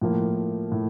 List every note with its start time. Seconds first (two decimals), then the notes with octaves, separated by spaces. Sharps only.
0.02 A2 F3 A#3
0.72 A2